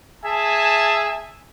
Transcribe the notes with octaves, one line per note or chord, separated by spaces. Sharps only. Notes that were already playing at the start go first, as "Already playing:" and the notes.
G#4 E5 G#5 A5